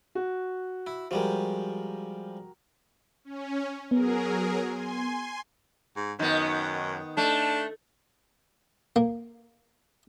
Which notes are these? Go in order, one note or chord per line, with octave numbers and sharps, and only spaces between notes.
F#4
E4
F3 G3 G#3 F#4 G4 A#4
C#4
F#3 B3 G#4 A#4
G#5 C6
G#2
F#2 D#3 B3
A3 D4
A#3